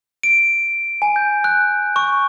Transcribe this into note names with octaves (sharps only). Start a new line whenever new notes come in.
D7
G#5
G6
F#6
C#6